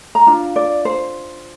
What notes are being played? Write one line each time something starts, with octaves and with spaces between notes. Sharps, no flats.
A#5
D4 F4
D5
C5